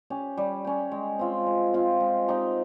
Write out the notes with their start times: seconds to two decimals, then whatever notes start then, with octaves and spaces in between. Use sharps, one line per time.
0.10 C#4 G4
0.37 G3
0.65 C#4 G4
0.92 G#3
1.19 C4 F4
1.46 G#3
1.74 C4 F4
2.00 G#3
2.28 C4 D#4 G4